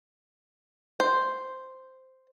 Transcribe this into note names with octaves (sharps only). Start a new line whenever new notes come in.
C5